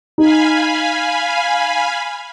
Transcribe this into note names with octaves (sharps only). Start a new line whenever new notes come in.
D#4 F5 G#5 B5